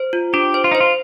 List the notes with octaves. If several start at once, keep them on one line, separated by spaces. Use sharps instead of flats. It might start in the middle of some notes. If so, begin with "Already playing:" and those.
Already playing: C5
F4
D4 G4
C5
F4
D#4
C5
F4